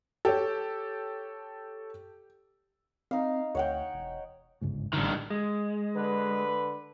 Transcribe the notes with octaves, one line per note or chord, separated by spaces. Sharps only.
G4 A4 C#5
C4 D#4 F5
D2 C#5 F#5 G5
E1
G1 C#2 G#2
A1 G2 D3 D#3
G#3
D3 B4